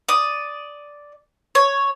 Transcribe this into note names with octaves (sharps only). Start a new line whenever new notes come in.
D5 D#6
C#5